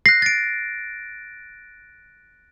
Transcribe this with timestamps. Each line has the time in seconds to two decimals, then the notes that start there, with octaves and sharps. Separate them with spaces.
0.06 F#6 A#6 C7
0.22 A6 D7